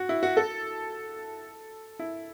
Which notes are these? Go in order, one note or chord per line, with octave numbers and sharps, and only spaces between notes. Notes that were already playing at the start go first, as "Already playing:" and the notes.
Already playing: F#4
E4
F#4
A4
E4